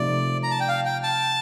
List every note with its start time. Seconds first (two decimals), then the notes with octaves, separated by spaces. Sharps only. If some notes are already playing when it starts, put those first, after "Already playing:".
Already playing: C3 F3 A3 D#4 D5
0.43 A#5
0.51 A5
0.60 G5
0.68 F5
0.85 G5
1.03 A5